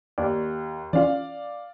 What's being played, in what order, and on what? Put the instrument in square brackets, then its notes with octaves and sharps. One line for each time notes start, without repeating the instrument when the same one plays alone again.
[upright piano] D#2 [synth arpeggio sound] D5
[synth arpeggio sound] E3 C#4 F4 [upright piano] D5 F5